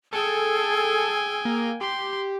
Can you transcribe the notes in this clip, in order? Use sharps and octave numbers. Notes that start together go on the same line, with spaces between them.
G#4 A4 G5 G#5 E6
A#3
G4 C6